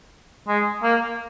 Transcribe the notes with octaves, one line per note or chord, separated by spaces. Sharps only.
G#3
A#3